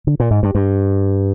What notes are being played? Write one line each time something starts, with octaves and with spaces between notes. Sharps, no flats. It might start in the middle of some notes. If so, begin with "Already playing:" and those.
D3
A#2
G#2
G2
G2